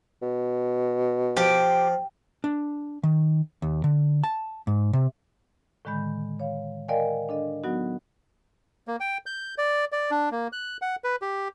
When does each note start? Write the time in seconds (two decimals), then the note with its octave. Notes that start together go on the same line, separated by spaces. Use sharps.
0.22 B2
1.37 F3 G4
2.44 D4
3.03 D#3
3.62 D#2
3.84 D3
4.24 A5
4.67 G#2
4.93 C3
5.85 A2 D3 D#3 G#3 B5 G6
6.40 C#5 F5
6.88 A#4 D5 D#5 F5 G5 G#5
7.29 D4 A4 D#5
7.64 F#3 B3 D#4 F#4
8.88 A#3
9.00 G5
9.26 G6
9.58 D5
9.92 D5
10.11 D4
10.31 A#3
10.52 F#6
10.82 F#5
11.04 B4
11.22 G4